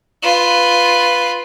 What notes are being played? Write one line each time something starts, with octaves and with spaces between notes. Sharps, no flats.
F4 B4